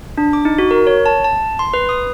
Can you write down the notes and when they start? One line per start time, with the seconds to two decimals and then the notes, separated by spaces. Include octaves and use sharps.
0.18 D4
0.33 D6
0.45 D#4
0.59 F#4
0.71 A#4
0.87 C#5
1.06 A5
1.24 A5
1.59 C6
1.74 B4
1.89 D#6